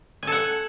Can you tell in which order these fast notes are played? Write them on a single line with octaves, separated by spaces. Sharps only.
G#5 A4 F#5